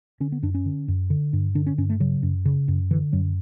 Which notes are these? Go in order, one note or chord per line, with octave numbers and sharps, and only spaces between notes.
D3 C#4
B3
F#2 D4
C#4
D3
F#2
D3
G2
D3 D4
C#4
G2 C#4
A3
C#3 F#3
F#2
C#3
F#2
D3 E3
F#2 F#3